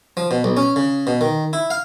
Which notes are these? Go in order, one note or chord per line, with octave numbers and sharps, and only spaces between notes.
F3
B2
B1
C#4
C#3
B2
D#3
E4
F5